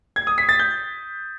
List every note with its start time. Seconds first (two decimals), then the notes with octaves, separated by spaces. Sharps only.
0.16 G#6
0.27 D#6
0.38 B6
0.49 A6
0.60 G6